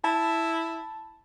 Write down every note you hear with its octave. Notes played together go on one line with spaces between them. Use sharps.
E4 A5